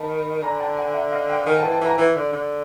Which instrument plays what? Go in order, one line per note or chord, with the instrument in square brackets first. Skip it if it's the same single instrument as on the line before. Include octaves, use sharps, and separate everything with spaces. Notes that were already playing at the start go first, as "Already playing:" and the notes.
Already playing: [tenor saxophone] D#3 [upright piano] A5 B5
[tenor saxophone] D3 [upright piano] G#5 A#5
[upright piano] G5 A5
F#5 G#5
E5 F#5
D#5 F5
F5 G5
[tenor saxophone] D#3 [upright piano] F#5 G#5
[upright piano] G5 A5
[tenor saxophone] E3
[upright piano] G5 A5
[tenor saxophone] E3 [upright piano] G#5 A#5
[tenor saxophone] E3
D3
D3